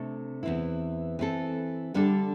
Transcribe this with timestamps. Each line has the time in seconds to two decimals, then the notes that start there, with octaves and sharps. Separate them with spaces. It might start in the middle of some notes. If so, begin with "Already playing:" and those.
Already playing: C3 A3 D4 A4
0.43 E2 E3 C4 E4
1.19 E3 C4 A4
1.94 D3 G3 D4 A4